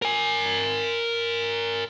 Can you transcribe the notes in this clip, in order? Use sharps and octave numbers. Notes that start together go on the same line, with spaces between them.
A#4 G#5